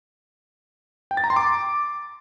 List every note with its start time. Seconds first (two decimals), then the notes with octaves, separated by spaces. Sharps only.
1.11 G5
1.17 A6
1.24 A#5
1.30 C6
1.36 D6